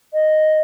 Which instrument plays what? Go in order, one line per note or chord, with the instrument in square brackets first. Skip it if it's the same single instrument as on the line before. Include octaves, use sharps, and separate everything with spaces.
[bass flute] D#5